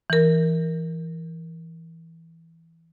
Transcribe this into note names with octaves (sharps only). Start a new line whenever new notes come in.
E3 A#4